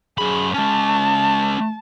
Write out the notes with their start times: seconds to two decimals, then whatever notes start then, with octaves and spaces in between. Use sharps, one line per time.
0.18 F#2 G#4 B5
0.54 G#3 C#4 A5